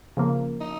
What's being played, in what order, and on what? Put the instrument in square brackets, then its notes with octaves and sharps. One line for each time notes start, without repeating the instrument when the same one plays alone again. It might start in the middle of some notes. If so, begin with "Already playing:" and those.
[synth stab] C#3 F3 A#3
[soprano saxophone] D#4